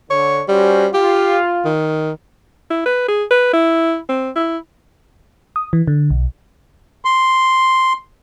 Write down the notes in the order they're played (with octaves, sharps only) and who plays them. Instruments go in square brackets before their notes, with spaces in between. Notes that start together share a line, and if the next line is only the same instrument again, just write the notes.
[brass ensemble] D3 [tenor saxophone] C#5
[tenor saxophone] G3 [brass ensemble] C#4 F#4 C5
[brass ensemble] F4 [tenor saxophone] G4
[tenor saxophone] D#3
[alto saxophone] E4
B4
G#4
B4
E4
C4
E4
[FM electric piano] D#6
E3
D3
B1
[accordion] C6